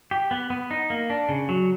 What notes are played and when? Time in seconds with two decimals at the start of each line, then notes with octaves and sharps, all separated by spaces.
0.11 G4
0.31 B3
0.50 B3
0.71 D#4
0.90 A#3
1.10 D4
1.29 C#3
1.49 F#3